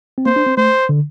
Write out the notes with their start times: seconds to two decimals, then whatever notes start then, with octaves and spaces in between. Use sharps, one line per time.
0.18 C4
0.26 A#3 C5
0.36 D4
0.47 C4
0.57 A3 C5
0.89 D3